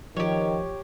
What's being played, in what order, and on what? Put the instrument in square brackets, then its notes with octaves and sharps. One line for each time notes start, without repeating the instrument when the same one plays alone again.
[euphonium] D#3 [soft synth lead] F3 [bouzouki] G4 C#5